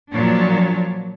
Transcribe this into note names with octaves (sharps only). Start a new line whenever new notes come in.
A#2 F3 F#3 D4 C#5